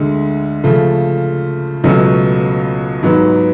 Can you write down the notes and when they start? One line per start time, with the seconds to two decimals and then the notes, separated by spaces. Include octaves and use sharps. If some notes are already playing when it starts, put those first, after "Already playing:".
Already playing: D2 D3 G#3
0.64 C#3 F3 A3
1.84 C#2 B2 F#3 A3 C#4
3.03 G#2 F#3 B3